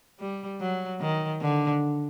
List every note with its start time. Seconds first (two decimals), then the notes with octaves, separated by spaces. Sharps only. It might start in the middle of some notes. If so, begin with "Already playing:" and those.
0.20 G3
0.60 F#3
1.01 D#3
1.41 D3